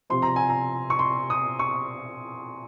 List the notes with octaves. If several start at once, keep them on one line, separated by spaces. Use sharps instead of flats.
C3 F3 C4 C6
A#5
G#5
A#5
C#6
C6
D#6
C#6